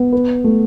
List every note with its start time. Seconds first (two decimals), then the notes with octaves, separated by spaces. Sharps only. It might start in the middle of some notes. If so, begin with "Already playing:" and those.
Already playing: B3
0.13 B4
0.44 A3